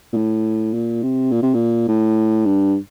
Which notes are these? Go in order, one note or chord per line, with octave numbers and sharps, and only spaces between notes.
A#2
A2
A#2
C3
A#2
C3
A#2
A2
G2